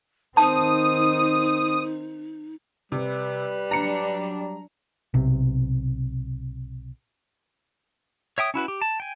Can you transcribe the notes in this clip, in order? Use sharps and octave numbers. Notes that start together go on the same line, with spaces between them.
D#3 C4 D#4 A5 D#6
C3 G3 B4
F#3 D4 A#5 C#7
B1 C3
C#5 E5 G5 D#6
C#4 E4 F#4 B4
G4
A5
G5 G#5